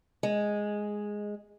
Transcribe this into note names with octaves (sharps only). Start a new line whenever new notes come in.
G#3